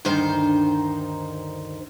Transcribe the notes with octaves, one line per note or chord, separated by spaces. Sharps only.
D2 G2 D#3 D#4 C5